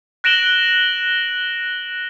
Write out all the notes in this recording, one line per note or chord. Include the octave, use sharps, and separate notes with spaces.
F#6 A#6 D7 E7 F#7 G7